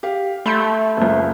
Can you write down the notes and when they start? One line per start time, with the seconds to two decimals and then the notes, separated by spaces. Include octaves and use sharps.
0.03 G4 F5
0.46 A3 B5 C6 G6
0.97 F#1 C#2